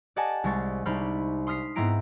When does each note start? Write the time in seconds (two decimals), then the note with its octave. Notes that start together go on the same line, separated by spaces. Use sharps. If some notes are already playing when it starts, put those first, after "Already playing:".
0.16 G4 D5 D#5 F#5 G#5 A5
0.44 C2 G#3 C#6 A6
0.85 C2 D4 D#4 C5 B5 F6
1.47 C6 D#6 F6 B6 C7
1.75 G#2 B3 C4 E4 A#5 D7